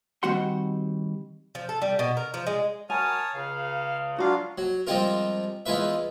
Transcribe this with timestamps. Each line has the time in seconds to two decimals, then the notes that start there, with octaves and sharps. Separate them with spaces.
0.23 D#3 G3 C4 F#4 F#5 C6
1.55 F3
1.69 A4
1.82 G3
1.99 B2
2.17 A#4
2.34 F3
2.47 G#3
2.90 F#3 A#4 C#5 G#5 A5 D#6 F6
3.34 C#2 C#3 F5
4.18 F#3 D4 F4 F#4 F5
4.58 F#3
4.87 F3 G3 G#3 C4 F4 A#4
5.66 E2 G#3 F4 B4 E5